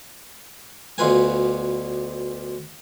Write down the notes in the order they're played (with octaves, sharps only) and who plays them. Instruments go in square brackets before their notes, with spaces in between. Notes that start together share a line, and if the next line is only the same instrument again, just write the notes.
[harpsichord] D2 B2 F4 B4 G#5